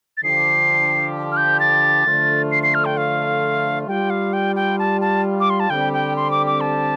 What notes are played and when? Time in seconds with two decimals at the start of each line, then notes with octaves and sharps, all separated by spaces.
0.17 A6
0.23 D3 F3 D4 G4 C7
1.32 F6
1.37 G6
1.60 A6
2.05 D3 F3 A3 F4
2.52 C7
2.63 C7
2.74 F6
2.85 G5
2.97 F5
3.88 G3 F4 G5
4.10 F5
4.33 G5
4.56 G5
4.79 A5
5.01 A5
5.40 D6
5.50 C6
5.60 A5
5.70 D3 G3 C4 G4 G5
5.93 G5
6.16 C6
6.31 D6
6.46 D6
6.61 A5